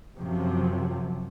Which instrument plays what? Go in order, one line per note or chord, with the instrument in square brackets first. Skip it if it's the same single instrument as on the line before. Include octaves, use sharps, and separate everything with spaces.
[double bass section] F#2 C3 F3 F#3